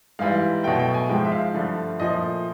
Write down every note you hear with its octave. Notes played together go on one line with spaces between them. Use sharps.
G#2 E3 G3 F5
B2 F#3 A3 G5
G5
G#5
G#2 F3 G#3 G5
E5
F5
G2 D3 F3 A3
A#2 F3 A3 D#5